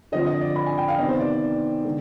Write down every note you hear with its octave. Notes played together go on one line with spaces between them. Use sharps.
D3 F3 C4 F4 D#5
D#5
D5
B5
G#5
G5
F5
C3 D#3 B3 D#5
C5
D5
D3 G#3